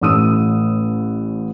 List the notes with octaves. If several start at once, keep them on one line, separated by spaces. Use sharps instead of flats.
A1 A2 D#6 E6 D#7